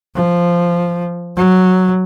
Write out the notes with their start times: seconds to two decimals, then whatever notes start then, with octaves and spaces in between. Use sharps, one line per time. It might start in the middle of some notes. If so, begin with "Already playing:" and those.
0.15 F3
1.37 F#3